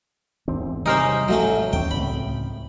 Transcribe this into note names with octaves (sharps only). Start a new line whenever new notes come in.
G#1 E2 C4
C3 G3 C#4 D#4 G4 G#4 A#4 C5
A1 F#3 A3 C#4
D#2 C#4 G5
C#2 A2 C4 B5